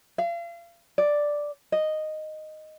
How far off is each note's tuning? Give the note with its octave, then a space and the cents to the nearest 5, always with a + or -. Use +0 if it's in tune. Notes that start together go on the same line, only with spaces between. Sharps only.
F5 -35
D5 +0
D#5 -5